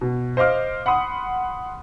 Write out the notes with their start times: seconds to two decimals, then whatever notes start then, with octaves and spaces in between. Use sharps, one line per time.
0.01 B2
0.37 C5 D#5 F5 D6 F6
0.86 F#5 B5 C6 D#6